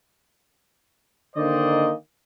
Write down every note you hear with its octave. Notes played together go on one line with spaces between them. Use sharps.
D3 D#3 A#3 C5 D5 D#5